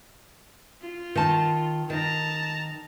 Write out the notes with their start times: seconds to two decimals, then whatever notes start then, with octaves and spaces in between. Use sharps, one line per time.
0.81 F4
1.15 D#3 A5
1.90 D#3 A5 A#5